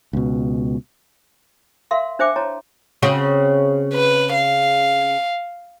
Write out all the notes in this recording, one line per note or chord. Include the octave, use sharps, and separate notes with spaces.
C#2 B2
A#4 E5 F5 C6
D4 C5 E5 G5 D6
E4 C#5 A5 A#5 C6
C#3 C4 F#4
B4
F5